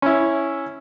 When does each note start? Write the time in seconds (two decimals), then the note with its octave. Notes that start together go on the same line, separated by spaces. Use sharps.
0.02 C#4 E4